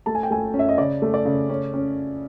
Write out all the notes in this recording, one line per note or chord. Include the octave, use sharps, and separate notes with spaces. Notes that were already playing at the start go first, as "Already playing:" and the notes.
A3 A5
G#5
G5
A3 G#5
C#4
E5
D#5
C#3 D5
A3
D5
C#3
C#4
C#4